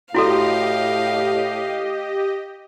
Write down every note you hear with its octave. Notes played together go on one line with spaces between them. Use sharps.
A2 E4 F#4 G4 A4 D#5 F5